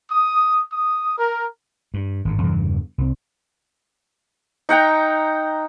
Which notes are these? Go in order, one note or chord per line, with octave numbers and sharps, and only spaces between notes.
D#6
D#6
A#4
G2
G#1 G2
E2 G2 C#3 E3
C2 C4
D#4 F#5 G5 A#5